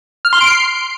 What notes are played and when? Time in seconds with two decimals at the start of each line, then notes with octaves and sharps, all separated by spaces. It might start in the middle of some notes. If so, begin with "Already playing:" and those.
0.25 F6
0.33 C6
0.41 D7
0.49 C7